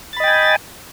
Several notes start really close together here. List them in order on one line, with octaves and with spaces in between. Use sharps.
A6 B5 D#5 G5 G#5